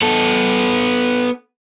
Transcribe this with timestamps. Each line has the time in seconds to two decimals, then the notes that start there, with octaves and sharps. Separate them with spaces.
0.02 B3 A4